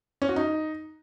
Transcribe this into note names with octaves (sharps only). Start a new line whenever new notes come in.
C#4
F#4
D#4